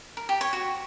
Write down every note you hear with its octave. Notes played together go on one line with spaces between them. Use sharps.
A#4
G4
C#5
F#4